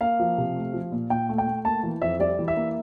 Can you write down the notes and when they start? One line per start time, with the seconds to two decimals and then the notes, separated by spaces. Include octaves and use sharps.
0.01 A#3 F5
0.20 F3
0.38 C3
0.56 A3
0.73 F3
0.92 A#2
1.10 A#2 G5
1.29 A3
1.38 G5
1.47 A3
1.65 A#3 A5
1.83 E3
2.02 F2 E5
2.19 G3 D5
2.39 E3
2.48 E5
2.57 A#3